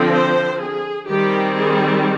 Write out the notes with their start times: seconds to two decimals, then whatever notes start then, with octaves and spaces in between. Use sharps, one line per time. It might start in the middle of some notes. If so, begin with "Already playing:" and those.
Already playing: D3 F3 C4
0.14 C5
0.61 G#4
1.08 D#3 G3 C4 G4
1.56 G#4